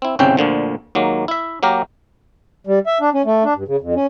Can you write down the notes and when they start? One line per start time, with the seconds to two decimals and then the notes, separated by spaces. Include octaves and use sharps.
0.02 C4 E4
0.19 G1 C2 C#3 C4 C#4 G5
0.37 D2 A#2 D3 F3
0.95 D#2 F#3 G#3 A#3
1.28 E4 E5
1.63 F#3 A#3 G4 A#4
2.67 G3
2.87 E5
3.01 D4
3.14 C#4
3.25 A3
3.44 D4
3.55 G2
3.68 C#3
3.81 F2
3.95 C#4